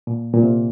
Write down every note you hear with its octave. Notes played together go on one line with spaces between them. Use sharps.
A#2
A#2
C3